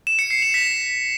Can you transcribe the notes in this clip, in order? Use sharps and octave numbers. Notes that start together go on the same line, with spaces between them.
E7
C#7
C7
F7
B6